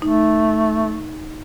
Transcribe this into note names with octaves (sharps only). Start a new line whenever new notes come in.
A3 D#4